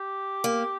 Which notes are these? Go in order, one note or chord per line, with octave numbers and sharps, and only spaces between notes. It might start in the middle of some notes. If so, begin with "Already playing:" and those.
Already playing: G4
A#3